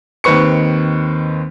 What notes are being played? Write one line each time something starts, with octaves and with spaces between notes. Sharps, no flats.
D#2 D#3 C4 B4 C#6 C#7